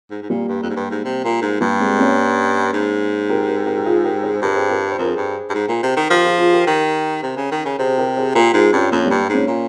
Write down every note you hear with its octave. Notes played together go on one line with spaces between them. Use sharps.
G#2
G#2
A#2 G3 A#3
G2
F2
G#2
G2
G#2
C3
A#2
G#2
G2 G3 A#3
G#3 C4
A#3 C#4
G#2
G4 A#4
G4 A#4
G4 A#4
G4
F4 G#4
G4 A#4
G#4 C5
G2 G4 A#4
G#4 C5
G4 A#4
C5
F2 A#4
G#4 C5
G2
G2
G#2
A#2
C3
D#3
F3 G4 A#4
F4 G#4
F4 G#4
G4 A#4
D#3
C3
C#3
D#3
C#3
C3 G#4 C5
G4 A#4
G#4 C5
A#2 G4 A#4
G#2 F4 G#4
G2 C#4 F4
F2 A#3 C#4
G2 G3 A#3
G#2 A#3 C#4
A#2